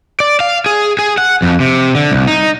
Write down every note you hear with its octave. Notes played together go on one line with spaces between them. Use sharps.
D5
F5
G#4
G#4
F#5
F2
C3
D3
C2
D#4